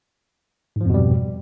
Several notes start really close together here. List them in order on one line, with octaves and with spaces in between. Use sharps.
G#2 F3 F2 B2 G3